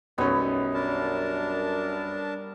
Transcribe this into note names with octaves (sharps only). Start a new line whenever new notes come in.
B1 F#2 G3 B3 C#4
D4 A#4 A5